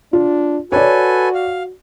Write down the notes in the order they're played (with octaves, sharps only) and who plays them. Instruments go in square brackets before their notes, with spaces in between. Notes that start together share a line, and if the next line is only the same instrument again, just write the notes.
[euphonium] D4 [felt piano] F4
[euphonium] F#4 [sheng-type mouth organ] A4 B4 G#5 [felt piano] C#5 D5
[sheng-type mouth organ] F5